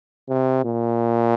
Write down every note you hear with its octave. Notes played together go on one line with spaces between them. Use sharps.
C3
A#2